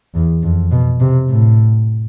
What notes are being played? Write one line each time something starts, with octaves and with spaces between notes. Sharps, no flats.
E2
F2
B2
C3
A2